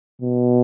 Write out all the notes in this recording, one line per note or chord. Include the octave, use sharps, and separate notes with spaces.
B2